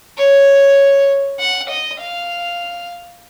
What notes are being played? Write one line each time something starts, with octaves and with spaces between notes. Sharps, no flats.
C#5
F#5
D#5
F5